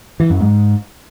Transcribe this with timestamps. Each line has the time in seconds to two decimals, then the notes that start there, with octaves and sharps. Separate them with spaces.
0.20 E3
0.30 F#2
0.40 G#2